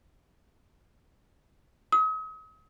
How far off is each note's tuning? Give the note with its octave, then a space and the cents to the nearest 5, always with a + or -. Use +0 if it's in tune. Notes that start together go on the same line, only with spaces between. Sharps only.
D#6 +40